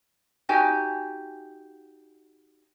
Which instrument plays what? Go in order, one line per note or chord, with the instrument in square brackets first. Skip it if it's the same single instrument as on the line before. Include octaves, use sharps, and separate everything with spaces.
[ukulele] D#4 F#4 G4 G#5